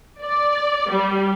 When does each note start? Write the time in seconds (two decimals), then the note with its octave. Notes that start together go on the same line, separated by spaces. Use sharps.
0.22 D5
0.90 G3